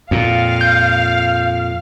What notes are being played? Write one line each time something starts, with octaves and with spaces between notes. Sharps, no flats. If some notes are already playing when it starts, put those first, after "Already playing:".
F2 A#2 F5
G6